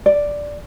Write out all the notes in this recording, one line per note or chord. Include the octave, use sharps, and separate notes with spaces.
D5